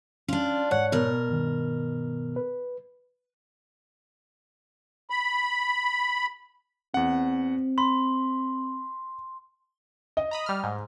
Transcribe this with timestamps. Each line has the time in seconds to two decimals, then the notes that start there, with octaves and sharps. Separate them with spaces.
0.28 C#4 D4 F4
0.71 G#2 C#5 F#5 F#6
0.92 B2 A#4
1.29 G2 D#3
2.36 B4
5.10 B5
6.94 E2 C4 F#5
7.78 B5 C6
10.17 D#5
10.31 A#5 B5 D#6
10.46 G3 F6
10.64 G#2